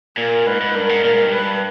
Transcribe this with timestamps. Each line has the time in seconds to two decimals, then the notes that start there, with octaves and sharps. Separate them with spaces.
0.17 A#2 A#4
0.46 G#2 B4
0.61 G#2
0.75 G2 A#4
0.89 G#2
1.03 A#2 A#4
1.13 G#2
1.23 G2
1.33 B4